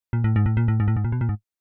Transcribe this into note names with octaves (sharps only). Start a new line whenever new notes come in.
A#2
A2
G#2
A2
A#2
A2
G#2
A2
G#2
A#2
B2
A#2
G#2